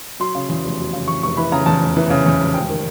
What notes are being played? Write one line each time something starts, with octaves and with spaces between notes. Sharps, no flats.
F#3 C6
C#3
E2
F1
F#3
C#3
E2 C#6
F1 C#6
E3 B5
C#3 A#5
E2 A5
F1
E3
C#3
E2
F1
G#1 G5
D#3